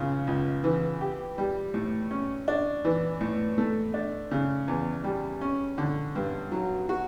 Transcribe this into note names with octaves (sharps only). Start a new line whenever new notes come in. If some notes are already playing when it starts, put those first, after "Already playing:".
Already playing: C#2 C#3
C#2
E3
G4
G3
A2
C#4
D4
E3
A2
A3
D4
C#3
E2
G3
C#4
D3
G2
F#3
F#4